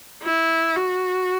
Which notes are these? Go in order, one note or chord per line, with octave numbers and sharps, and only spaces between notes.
E4
F#4